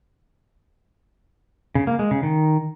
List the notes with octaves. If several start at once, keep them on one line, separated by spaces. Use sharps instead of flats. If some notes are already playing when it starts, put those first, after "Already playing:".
C#3
A#3
G#3
C#3
D#3